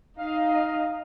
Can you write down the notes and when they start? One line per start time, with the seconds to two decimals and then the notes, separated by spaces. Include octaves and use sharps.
0.18 D#4 D#5 F5